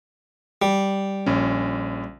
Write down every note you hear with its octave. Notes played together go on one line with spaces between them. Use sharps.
G3
A#1 C#4